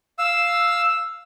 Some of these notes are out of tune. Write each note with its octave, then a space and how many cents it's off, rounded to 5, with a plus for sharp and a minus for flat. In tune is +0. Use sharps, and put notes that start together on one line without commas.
F5 +0 E6 +0